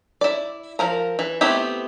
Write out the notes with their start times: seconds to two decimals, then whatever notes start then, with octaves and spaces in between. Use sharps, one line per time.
0.21 E4 D5
0.79 F3 A#4 A#5
1.19 E3
1.41 A3 B3 C4 E4 G4